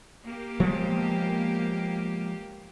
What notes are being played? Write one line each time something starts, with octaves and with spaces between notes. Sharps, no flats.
A#3 G4
F3 G#3 B3